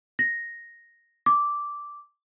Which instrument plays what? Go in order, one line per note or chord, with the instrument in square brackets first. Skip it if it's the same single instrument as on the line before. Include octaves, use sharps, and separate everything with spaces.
[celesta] A#6
D6